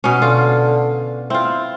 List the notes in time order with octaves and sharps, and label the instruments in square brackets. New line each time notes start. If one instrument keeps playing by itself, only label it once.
[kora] B2 C#4
[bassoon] D3 [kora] F4
[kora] C4 F4 [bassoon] E4